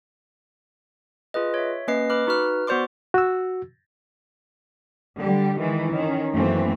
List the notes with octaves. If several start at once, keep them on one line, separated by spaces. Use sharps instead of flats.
F4 G#4 B4 D#5
C#5 E5
A#3 C#4 B4 D#5 C7
B4 B5 D6 F6
D#4 F#4 B4 F6
B3 F#4 C5 D5 C6 D6
F#4 E6
D3 G3 G4
D#3 E3 G#3
D#3 C#4
F#2 E3 A3 A#3 C4